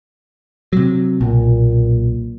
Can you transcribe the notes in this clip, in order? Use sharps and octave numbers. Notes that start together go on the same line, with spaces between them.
C3 F#3
B1 A#2